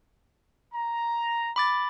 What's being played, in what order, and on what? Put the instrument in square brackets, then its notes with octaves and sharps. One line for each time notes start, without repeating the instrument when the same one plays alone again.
[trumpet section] A#5
[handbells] B5 D6 A6